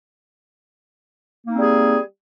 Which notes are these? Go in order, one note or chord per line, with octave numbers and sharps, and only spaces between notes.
G3 A#3 C4 D#4 G#4